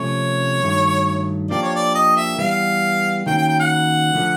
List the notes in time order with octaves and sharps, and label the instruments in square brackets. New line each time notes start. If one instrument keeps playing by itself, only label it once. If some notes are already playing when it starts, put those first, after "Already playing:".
Already playing: [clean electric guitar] C3 F3 A3 C#4 [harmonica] C#5
[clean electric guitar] G2 D#3 F#3 A3
[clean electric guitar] F3 A#3 D4 G4 [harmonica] D5
[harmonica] C#5
D5
D#5
E5
[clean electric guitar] E3 G3 B3 [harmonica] F5
[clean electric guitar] D#3 F#3 A#3 C#4 [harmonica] G5
[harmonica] G5
G5
F#5
[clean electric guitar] D3 F3 A3